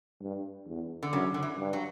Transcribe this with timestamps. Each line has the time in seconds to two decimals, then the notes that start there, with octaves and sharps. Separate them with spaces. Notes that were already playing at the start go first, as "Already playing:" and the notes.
0.21 G2
0.67 E2
1.03 D3
1.13 F#2 C#3
1.34 D3
1.43 E3
1.58 G2
1.73 F#3